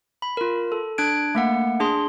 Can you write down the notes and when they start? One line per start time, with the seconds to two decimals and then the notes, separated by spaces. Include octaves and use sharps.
0.22 B5
0.37 F4 A#4
0.72 A4
0.98 D4 F#6 G#6 D7
1.35 A3 A#3 F#5
1.80 D4 G#4 C6